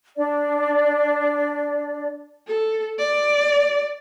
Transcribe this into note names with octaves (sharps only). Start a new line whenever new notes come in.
D4 D5
A4
D5